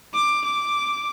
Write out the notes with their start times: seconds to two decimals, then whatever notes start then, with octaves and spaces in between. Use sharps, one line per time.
0.14 D6
0.45 D6